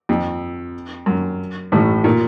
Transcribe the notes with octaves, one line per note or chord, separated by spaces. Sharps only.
F2
F#2
A1 A2
A#2